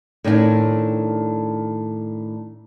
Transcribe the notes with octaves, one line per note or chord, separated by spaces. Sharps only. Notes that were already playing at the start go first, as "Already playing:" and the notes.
A2 D#3 C4 D4 F5 G#5